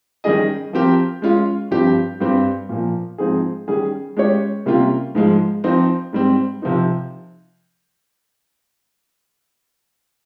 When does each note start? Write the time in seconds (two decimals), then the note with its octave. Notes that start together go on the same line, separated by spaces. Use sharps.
0.24 D#3 G3 C#4 G#4 D#5
0.73 F3 C4 G4 A#4
1.22 G#3 C#4 F4
1.71 G2 F3 C4 G4
2.20 G2 G3 C4 G4
2.69 A#2 F3 A#3
3.18 G#2 F3 C4 D#4 G#4
3.68 D#3 G3 C#4 G#4
4.17 G#3 C#4 G4 C#5
4.66 C3 G3 A#3 C#4 F4
5.15 G#2 F3 G#3
5.64 F3 C4 D#4
6.13 G#2 G3 C4
6.62 C3 F3 C4 D#4